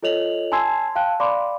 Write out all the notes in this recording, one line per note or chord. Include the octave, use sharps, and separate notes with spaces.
F4 A4 C#5 D#5 F7 F#7
G#5 A5 C6 E6 G#6 C7
F5 G5 A5 F#6
D5 F5 B5 C6 D6